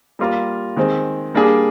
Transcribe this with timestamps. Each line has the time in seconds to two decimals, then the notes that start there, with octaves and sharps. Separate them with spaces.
0.19 G3 A#3 F4 A#4
0.76 D#3 G#3 C4
1.34 G3 A#3 D4 G#4